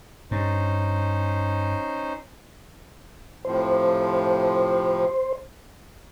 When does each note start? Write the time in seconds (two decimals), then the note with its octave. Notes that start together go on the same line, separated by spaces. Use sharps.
0.31 G2 C#4 D#4 C5
3.45 A2 C3 F3 C5